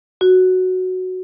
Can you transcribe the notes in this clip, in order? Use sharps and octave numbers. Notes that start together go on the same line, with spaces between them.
F#4